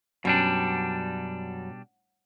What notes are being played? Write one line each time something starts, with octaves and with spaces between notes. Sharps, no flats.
F#2 B2 G3 D4